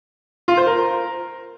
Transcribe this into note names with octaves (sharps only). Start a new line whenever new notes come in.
F4
C5
A#4